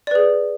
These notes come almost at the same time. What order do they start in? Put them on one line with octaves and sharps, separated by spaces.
D5 B4 G#4